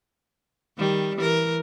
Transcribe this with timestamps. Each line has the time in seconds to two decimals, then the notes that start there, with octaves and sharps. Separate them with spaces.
0.78 D#3 G3
1.16 E3 A#4